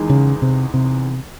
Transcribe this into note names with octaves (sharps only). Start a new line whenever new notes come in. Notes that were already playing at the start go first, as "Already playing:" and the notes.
Already playing: E2 D#3 G#3 D#4
C#3
C3
C3